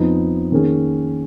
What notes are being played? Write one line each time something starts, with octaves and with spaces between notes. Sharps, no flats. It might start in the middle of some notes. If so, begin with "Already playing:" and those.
Already playing: F2 F3 B3 D#4
D#3 A#3 C#4 G#4